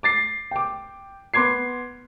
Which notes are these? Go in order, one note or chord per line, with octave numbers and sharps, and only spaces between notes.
D6 A6 C7
G5 D6
B3 C6 D6 G#6 C7